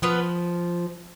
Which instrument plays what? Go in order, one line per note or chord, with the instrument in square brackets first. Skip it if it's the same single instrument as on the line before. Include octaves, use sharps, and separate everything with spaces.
[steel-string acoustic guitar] F3 [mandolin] B3 F4 B4